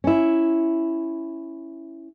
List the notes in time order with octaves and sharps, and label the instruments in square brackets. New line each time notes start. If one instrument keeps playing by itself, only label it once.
[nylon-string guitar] C#4 E4